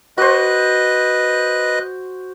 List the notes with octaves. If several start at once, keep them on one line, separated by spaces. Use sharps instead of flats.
F#4 B4 C5 D#5 F#6